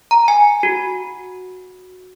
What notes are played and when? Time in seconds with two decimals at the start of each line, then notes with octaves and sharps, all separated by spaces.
0.11 A#5
0.28 G#5
0.63 F#4